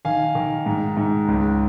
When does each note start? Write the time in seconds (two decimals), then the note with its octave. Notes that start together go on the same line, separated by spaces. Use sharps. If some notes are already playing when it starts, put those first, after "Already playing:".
0.05 D#3 F5 G#5
0.35 D#3
0.66 G#2
0.97 G#2
1.28 C#2